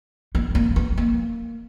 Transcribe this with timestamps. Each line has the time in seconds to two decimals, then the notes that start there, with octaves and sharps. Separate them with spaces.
0.35 B3
0.55 A#3
0.76 B3
0.97 A#3